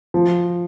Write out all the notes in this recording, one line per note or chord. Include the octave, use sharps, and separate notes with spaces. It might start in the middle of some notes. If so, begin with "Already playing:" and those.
F3